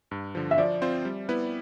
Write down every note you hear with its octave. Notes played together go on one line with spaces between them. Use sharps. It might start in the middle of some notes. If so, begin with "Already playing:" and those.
G2
D3 F3
E5
F3 D5
C4 F4 C5
G3
B3 E4 B4